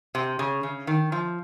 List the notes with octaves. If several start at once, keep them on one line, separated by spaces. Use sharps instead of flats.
C3
C#3
C#3
D#3
F3